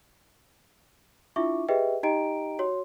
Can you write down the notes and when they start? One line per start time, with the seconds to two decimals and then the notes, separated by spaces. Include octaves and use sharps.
1.36 D4 E4 F4 E5 C#6 D6
1.68 G4 G#4 B4 D#5 E5 G5
2.03 D#4 G4 D#5 G5 A#5 D7
2.59 F#4 C#5 C6